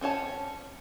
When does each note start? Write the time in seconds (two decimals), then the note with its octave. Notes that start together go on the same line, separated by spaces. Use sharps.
0.01 C4 C#4 C#5 A5